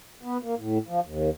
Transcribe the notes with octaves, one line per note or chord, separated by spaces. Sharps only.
B3
A#3
A2
F3
D#2